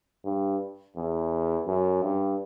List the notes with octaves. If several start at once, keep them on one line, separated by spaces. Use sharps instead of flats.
G2
E2
F#2
G2